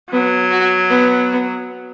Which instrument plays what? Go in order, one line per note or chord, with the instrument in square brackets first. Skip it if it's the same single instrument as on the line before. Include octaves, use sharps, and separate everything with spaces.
[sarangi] F#3 [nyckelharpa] B3
[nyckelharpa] F#4
B3